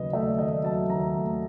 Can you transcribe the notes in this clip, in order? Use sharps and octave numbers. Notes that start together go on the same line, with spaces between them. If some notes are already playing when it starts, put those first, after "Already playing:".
Already playing: D#2 C#3 F#3 B4 D#5
A3 E5
D#2 D#5
F#3 A5
D#2 A#5
A3